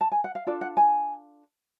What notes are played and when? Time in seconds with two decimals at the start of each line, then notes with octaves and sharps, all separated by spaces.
0.01 A5
0.12 G#5
0.24 F#5
0.35 F5
0.47 D4 F4 A4 D5
0.61 F#5
0.77 G#5